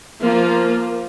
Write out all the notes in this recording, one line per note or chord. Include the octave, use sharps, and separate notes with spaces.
F3 A#3 F4